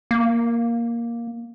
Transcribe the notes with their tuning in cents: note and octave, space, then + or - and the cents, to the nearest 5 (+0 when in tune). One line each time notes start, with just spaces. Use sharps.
A#3 +5